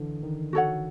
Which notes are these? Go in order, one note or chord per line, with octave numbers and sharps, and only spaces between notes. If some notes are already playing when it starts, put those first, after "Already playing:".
Already playing: D3 E3
D#3
F#4 A4 C#5 F#5